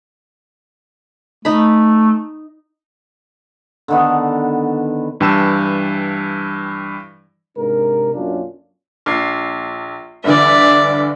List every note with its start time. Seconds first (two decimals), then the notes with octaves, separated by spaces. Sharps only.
1.45 A3 D#4 B5
3.88 D3 D#3 B3
5.21 G2 E3 G5 A5 E6 E7
7.56 G#2 C3 D4 A#4
8.14 B1 F#2 A#3 C#4 D4 F4
9.06 A#1 C7
10.24 G2 D3 E3 D5 E5